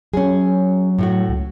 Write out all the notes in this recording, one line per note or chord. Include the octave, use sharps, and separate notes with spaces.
F#3 C#4 G#4
A2 A3 F#4
C#2